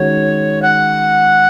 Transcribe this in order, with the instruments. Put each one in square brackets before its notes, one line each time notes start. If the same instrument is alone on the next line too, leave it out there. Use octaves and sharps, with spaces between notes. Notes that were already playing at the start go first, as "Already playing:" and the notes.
Already playing: [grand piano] D#3 G#3 C#4 F#4 [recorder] C#5
[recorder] F#5